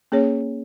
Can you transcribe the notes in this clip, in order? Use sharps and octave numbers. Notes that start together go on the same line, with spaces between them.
A#3 C#4 G#4 C#5